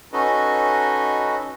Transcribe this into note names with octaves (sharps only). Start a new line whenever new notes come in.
C#4 D#4 F#4 A4 B4 D#5